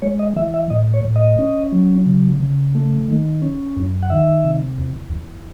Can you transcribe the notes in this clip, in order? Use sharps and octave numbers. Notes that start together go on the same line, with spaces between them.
G#3 C#5
D#5
E3 E5
E5
A2 D#5
C#5
A2
D#5
C#4
F#3
C#3
C#3
A3
D#3
C#4
F#2
F#5
D#3 E5
C3
E2
E2